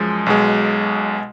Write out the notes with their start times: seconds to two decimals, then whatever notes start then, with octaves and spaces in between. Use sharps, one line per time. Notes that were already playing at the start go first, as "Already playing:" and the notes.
Already playing: F#2 F3 G#3
0.26 B1 B2 G#3